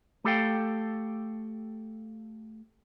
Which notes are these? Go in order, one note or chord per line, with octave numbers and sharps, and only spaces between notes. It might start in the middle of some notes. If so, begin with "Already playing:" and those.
A3 G4 A4 F5 G5